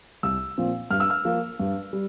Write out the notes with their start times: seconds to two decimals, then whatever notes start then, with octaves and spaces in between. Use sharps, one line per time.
0.23 C2 E6
0.58 A#2 F3 C4
0.90 G2 F6
1.00 E6
1.10 F6
1.25 F3 A#3
1.60 G2
1.93 G3